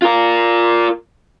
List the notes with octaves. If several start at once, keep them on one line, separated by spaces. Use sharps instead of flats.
F4 A#4